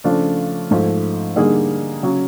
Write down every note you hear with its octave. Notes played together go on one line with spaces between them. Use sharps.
C#3 F3 A3 D4 F4
G#2 F3 A3
D3 G3 A#3 D#4 G#4
C#3 F#3